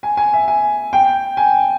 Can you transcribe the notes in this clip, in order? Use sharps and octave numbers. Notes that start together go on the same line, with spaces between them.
G#5
G#5
E5
G#5
G5
G#5